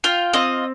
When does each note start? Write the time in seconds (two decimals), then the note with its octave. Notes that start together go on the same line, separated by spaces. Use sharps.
0.04 F4 G5
0.33 C4 D#5